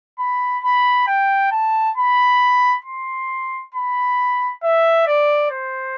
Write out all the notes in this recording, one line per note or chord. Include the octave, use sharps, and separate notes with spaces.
B5
B5
G5
A5
B5
C6
B5
E5
D5
C5